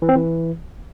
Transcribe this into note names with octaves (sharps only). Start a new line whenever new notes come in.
E3
C4
E3